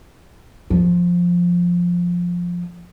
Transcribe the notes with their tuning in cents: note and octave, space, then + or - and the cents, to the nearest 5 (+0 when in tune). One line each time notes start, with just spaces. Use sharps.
F3 +10